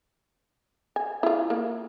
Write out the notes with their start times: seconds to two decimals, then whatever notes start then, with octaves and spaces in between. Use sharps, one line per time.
0.96 G#5
1.23 E4 F4
1.50 A#3